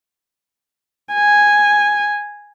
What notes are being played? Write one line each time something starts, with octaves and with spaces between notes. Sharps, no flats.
G#5